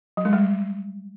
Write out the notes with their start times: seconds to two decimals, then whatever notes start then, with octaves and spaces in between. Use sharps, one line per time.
0.17 F#3
0.25 G#3
0.33 G3